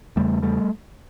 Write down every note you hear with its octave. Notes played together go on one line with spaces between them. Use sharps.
E2 C#3 G3 A3
G3 A3